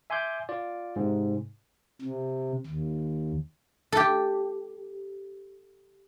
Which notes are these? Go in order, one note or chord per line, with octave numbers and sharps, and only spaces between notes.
E5 G#5 C6 D6 G6
F4 D5
G#2 C3
C3
D#2
G4 A4